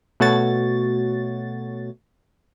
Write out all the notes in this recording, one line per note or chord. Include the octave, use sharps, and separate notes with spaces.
B2 A3 F#4 C#5 A6